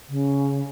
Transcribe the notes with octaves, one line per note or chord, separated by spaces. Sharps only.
C#3